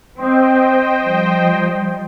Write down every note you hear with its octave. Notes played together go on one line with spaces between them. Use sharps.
C4 C5 D#5 G5
F3 G3